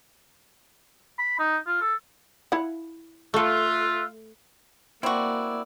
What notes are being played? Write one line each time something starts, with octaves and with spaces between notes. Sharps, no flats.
B5
D#4
F4
A4
E4 F#5
A3 F4 A4 E5 E6 F#6
A#3 C4 E4 F#4 D5